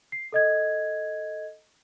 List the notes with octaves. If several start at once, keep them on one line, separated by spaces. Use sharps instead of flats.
C7
A4 D#5 G#6